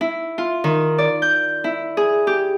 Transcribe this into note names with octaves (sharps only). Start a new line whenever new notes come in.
E4
F4
D#3
D5
G6
E4
G#4
G4